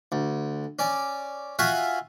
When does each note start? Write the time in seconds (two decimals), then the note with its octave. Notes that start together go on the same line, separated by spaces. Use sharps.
0.12 D2
0.79 C#4 D5
1.59 F4 F#4 E5 F#5 G#5 C#6